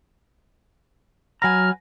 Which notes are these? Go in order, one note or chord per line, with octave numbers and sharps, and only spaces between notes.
F#3 B4 F#5 G#5 A#5 F6 A#6